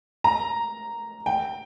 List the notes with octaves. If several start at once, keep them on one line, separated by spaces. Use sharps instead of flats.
A#5
G5